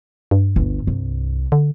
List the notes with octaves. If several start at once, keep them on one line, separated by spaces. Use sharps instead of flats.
G2
G1 D2
C2
D3